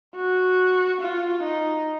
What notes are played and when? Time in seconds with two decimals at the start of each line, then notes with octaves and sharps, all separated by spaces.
0.16 F#4
1.01 F4
1.43 D#4